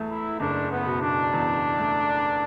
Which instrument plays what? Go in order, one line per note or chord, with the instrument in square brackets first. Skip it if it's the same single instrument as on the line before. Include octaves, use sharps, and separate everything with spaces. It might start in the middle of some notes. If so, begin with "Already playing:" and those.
Already playing: [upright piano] E2 A3
[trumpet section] E4
[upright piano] F#1 [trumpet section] D4
[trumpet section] B3
[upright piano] B2
[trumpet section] D4
[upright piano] E2
A3